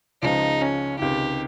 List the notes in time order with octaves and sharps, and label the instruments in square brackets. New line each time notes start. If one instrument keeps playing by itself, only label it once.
[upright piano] C#2 C#3 F3 G#3 [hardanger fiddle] D#4
[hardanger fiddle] C#4
[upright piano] C#2 C3 D#3 [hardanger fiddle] G4